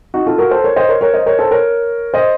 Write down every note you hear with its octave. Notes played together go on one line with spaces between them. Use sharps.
D#4 F#4
F4 A4
F#4 A#4
A4 C5
A#4 C#5
C5 D#5
A#4 C#5
A#4 C#5
C5 D#5
A#4 C#5
A4 C5
A#4 C#5
C5 D#5